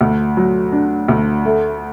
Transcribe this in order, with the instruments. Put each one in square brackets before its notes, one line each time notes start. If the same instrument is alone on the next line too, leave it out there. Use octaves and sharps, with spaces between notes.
[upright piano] D2
F#3
D4
D2
A3